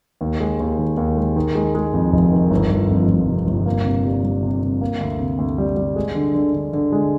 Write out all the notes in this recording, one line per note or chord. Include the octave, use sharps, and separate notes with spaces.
D#2
G#3
D#2
D#3
D#2
G#3
D#3
G#3
G#3
F2
F1
D#3
G1
G1
F2
G1
C3
G1
A#3
C3
G3
G3
C3
C3
A#3
D2
C3
D2
G3
G3
G#3
D3
D3
D3
D3
G#3